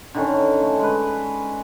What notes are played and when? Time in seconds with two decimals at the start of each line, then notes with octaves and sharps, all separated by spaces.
0.15 D3 D#3 C#4
0.62 A3
0.79 G#3 B4